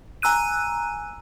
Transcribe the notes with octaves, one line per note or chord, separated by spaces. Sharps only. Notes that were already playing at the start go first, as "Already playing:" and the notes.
G#5 A#5 E6 F#6 D#7